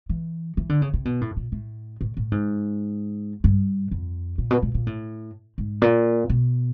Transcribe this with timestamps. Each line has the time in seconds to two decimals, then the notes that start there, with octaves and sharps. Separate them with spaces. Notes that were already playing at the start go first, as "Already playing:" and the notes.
0.09 E3
0.57 E3
0.69 D3
0.82 C#3
0.94 C3
1.05 B2
1.21 A2
1.37 A#2
1.52 A2
2.01 A2
2.17 A2
2.32 G#2
3.44 G2
3.91 F2
4.38 A#2
4.51 B2
4.62 A#2
4.74 A#2
4.87 A2
5.58 G#2
5.82 A#2
6.29 B2